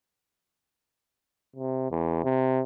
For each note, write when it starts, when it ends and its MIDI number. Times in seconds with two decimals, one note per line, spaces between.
1.56 1.87 48
1.91 2.24 40
2.24 2.62 48